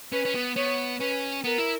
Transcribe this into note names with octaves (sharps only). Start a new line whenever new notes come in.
C#4 B4
C#4
B3
B3 C#5
C#4 B4
B3 A#4
E4